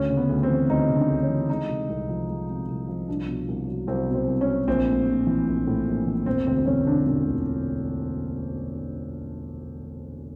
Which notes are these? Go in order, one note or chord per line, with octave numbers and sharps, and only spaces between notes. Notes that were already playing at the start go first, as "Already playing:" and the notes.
Already playing: D2 C#4
C#3
B3
D2
C4
E3
D2 D#4
C#3
D4
D2
C#4
E3
G#3 D#4
C3
C2
F3
G#3
C3
C2
F3
C2 D4
B2
C2
F#3
C2 C4
B2
C4
C2
C#4
F#3
A#1 C4
A2
A#1
E3
A#1
A2
A#1
E3
E1 C4
D2 C4
E1 C#4
D3 D4
E1 D4
D2